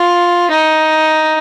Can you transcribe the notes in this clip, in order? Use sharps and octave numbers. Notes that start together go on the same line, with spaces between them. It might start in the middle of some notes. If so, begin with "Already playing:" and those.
Already playing: F4
D#4